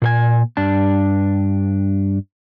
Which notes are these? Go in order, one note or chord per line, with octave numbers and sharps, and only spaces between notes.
A#2 A4 G#5
G2 D4 A5